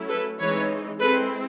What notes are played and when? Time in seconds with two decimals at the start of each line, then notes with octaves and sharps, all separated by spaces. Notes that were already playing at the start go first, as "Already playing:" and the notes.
Already playing: F#3 A3 C#4 E4
0.09 A4 B4
0.39 E3 G#3 C4 D#4 B4 C#5
1.00 G#3 C4 E4 A4 B4